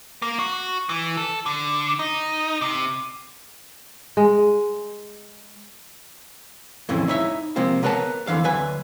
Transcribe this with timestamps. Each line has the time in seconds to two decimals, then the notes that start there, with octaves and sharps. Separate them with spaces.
0.22 A#3
0.39 F#4
0.89 E3
1.17 A4
1.46 D3
1.99 D#4
2.61 C3
4.17 G#3
6.89 F2 A2 C#3 E3
7.08 D#4 E4 C#5 E5
7.56 C3 F3 G#3 A#3 C4
7.83 B3 A#4 B4 C#5 F#5 A5
8.27 F2 D3 E3 F5
8.44 D2 F#3 B4 G#5